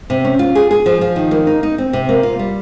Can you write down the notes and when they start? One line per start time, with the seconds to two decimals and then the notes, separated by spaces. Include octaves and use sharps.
0.10 C3
0.25 C#4
0.39 F4
0.55 G#4
0.71 G#4
0.86 F3
1.01 F3
1.16 D#3
1.31 A#3
1.47 D#4
1.63 D#4
1.78 C4
1.93 C3
2.09 A#3
2.23 F4
2.39 G3